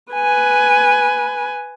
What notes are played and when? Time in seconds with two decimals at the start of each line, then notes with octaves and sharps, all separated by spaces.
0.13 B4 G#5